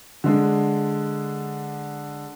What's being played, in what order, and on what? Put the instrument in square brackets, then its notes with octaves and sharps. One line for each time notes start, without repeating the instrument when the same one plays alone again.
[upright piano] D3 G#3 D4